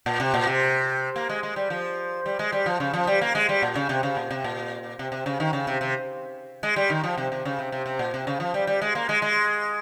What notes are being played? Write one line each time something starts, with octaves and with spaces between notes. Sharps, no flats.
A#2
C3
A#2
C3
A#3
G#3
G#3
G3
F3
G3
G#3
G3
F3
C#3
F3
G3
A#3
G#3
G3
A#2
C#3
C3
C#3
A#2
C3
A#2
C3
C3
C#3
D#3
C#3
C3
C3
G#3
G3
D#3
F3
C3
C3
C#3
C3
C3
C3
A#2
C3
C#3
F3
G3
G3
G#3
A#3
G#3
G#3